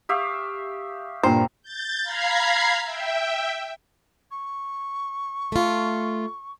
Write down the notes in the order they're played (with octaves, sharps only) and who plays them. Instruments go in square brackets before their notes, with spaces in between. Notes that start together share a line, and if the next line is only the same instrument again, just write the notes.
[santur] G4 E5 F5 [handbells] C#6 D#6
[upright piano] G2 A#2 [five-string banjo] C5 [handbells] G5 A#5
[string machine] G6 A6
F5 A#5 B5 G#6 C7
E5 G5
[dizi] C#6
[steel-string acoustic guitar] A3 F4